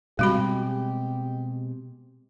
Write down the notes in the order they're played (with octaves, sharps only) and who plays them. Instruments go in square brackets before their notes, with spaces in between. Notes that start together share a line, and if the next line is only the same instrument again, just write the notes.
[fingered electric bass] B2 G#3 C4 [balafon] G3 F#4 B5 [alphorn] G4